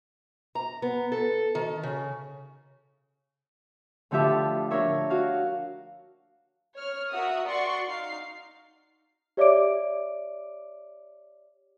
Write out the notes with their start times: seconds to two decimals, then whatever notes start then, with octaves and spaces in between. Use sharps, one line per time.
0.55 A#5
0.82 B3
1.12 A4
1.55 D#3
1.83 C#3
4.11 A2 D3 F3 G4 E5 D6
4.71 D4 A#4 C#5 E5
5.10 F#4 F5
6.75 C#5 F6
7.12 F#4 A#4 E5 F#5 D#6
7.47 F#4 D5 C6 C#6
7.87 D#4 F5 C7
9.37 G4 C#5 D5 E5 D6 D7